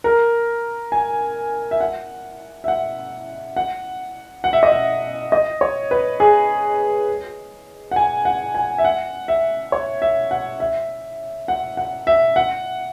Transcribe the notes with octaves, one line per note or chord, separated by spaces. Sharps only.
A#4
G#5
E5
F#5
E5
F#5
F#5
F#5
E5
D#5
E5
D#5
C#5
B4
G#4
F#5
G#5
F#5
G#5
E5
F#5
E5
C#5
E5
F#5
E5
F#5
F#5
E5
F#5